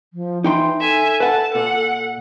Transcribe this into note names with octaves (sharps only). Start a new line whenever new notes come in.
F3
E3 D#4 G5 C6
A4 E5 G#5
B4 F#5 A5
A#2 F#5